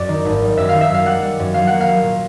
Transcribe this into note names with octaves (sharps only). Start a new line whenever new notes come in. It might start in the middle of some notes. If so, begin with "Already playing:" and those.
Already playing: F#2 D5
D#3
G#1
G3
F#2 E5
D#3 F5
E5
F#2 F5
G3 F#5
G3
F#2
F#3 F5
A#3 F#5
F5
F#3
A#2